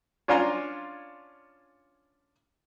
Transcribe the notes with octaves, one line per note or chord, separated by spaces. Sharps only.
C#4 D4 F4 G#5 A#5 C6